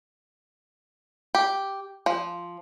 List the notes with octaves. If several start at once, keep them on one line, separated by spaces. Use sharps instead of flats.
G4
F3